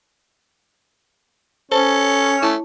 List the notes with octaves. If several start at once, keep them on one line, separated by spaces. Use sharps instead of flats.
C#4 A4 C5 C#5 A5
A3 E4 A5